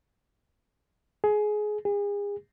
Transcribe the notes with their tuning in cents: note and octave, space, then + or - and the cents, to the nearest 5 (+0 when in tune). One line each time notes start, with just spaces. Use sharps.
G#4 +20
G#4 -35